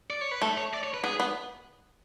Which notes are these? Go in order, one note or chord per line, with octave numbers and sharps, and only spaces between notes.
D5
C#5
B4
A3 A4
C#5
D5
C#5
B4
B3 G#4
B3